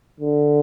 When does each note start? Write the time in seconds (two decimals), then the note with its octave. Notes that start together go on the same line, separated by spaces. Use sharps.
0.20 D3